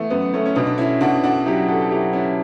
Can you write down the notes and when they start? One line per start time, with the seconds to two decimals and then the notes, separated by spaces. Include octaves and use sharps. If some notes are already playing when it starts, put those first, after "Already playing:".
Already playing: E3 A3 B3
0.10 F#2 B3
0.34 A3 C#4
0.45 C#4
0.55 B2 B3 D4
0.67 D4
0.78 C#4 E4
1.01 B2 D4 F#4
1.24 D4 F#4
1.46 F#3 E4 G4
1.68 F#4 A4
1.81 A4
1.91 F#3 E4 G4
2.13 C#4 E4